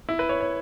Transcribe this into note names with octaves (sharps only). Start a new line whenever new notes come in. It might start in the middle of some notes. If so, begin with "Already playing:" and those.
E4
B4
C#5
C#5